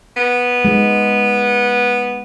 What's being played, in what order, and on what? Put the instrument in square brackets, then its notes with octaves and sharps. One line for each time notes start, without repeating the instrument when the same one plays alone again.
[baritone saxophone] B3
[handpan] G#3